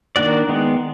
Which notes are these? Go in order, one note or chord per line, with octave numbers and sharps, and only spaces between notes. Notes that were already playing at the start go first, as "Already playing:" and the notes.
D#3 A#3 D4 F#4 D5
D#3 G#3 B3